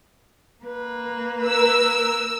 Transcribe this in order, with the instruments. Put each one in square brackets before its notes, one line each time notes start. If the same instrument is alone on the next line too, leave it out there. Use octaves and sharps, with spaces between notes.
[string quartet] A#3 B4
[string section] A#4 E6